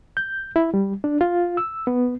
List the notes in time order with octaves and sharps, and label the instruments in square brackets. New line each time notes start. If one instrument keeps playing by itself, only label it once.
[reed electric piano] G6
E4
G3
D4
F4
E6
B3